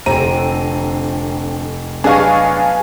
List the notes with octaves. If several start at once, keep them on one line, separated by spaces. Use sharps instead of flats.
F1 D3 C4 A#5 D#7
F#3 B3 D4 G#4 D#5 F5 G#5 C#6